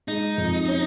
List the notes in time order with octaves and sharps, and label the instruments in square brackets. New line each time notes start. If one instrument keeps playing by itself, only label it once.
[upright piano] G#3 [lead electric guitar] D#4
[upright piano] F2
C#4